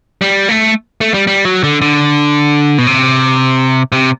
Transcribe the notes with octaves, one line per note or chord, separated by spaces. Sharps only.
G3
A3
A3
G3
G3
F#3
D3
D3
B2
C3
C3